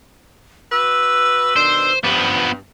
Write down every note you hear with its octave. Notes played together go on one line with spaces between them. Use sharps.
F#4 B4 E6
B2 D#3 D4 C5
G2 F3 B3